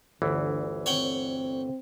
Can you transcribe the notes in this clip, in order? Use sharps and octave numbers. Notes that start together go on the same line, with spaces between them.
G1 D2 D3 E3
C4 C#5 F#5 G5